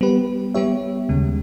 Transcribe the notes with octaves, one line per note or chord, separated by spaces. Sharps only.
G3 B3 G4 B4
G3 B3 G4 C#5 E5
D#2 C#3 G#3